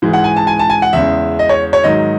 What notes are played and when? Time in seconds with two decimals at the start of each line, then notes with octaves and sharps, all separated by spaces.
0.02 G#2 E3 G#3
0.13 F#5
0.24 G#5
0.36 A5
0.47 G#5
0.59 A5
0.70 G#5
0.82 F#5
0.93 E2 C#3 G#3 E5
1.39 D#5
1.49 C#5
1.73 C#5
1.84 G#2 D#3 F#3 D#5